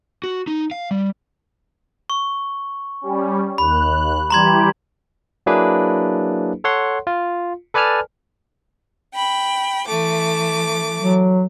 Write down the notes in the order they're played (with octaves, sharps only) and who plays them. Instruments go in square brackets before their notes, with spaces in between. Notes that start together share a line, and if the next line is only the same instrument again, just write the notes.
[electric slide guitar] F#4
D#4
F5
G3
[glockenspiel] C#6
[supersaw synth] G3 C#4
[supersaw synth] D#2 F#6 [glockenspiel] B5
[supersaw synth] E3 G3 G4 [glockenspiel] A#5 C6 G#6
[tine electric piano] F#3 A#3 D4 E4 G#4 B4
A4 C#5 F#5 C6
F4
A4 B4 D5 G#5 A5 F6
[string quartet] G5 B5
E3 A3 D6
[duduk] F#3